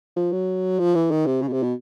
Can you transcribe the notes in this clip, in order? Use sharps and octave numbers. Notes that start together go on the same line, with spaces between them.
F3
F#3
F3
E3
D#3
C3
C#3
B2
C3
B2